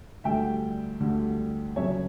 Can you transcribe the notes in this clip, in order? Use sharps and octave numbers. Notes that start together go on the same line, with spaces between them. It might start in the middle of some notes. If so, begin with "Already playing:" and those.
D2 D3 G3 E5 G5
D2 D3 G3
F#1 F#2 C#3 C#5 E5